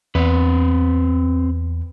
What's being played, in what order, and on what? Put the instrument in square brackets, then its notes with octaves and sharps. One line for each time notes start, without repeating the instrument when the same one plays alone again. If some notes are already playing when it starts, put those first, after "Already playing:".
[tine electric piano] E2 [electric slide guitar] C4 B4